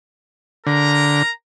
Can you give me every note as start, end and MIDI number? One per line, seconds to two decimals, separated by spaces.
0.67 1.23 50
0.67 1.30 70
0.67 1.30 82